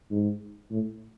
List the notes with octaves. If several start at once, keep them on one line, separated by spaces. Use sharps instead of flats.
G#2
A2